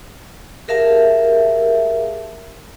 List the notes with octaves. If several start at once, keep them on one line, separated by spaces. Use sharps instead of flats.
G4 G#4 A#4 E5 F5 A5